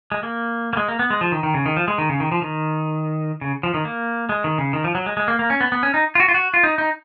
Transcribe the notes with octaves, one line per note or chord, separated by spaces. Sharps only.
G#3
A#3
A#3
G#3
A#3
B3
G#3
F3
D#3
D#3
C#3
D#3
F3
G#3
D#3
C#3
D#3
F3
D#3
C#3
F3
D#3
A#3
G#3
D#3
C#3
D#3
F3
F#3
G#3
G#3
A#3
A#3
C#4
B3
B3
C#4
D#4
F4
F#4
F4
F#4
F4
D#4
D#4